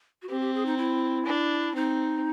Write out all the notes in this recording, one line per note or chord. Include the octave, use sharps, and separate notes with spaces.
F#4
C4 G4
G4
G#4
D#4
E4
D4
C4 D#4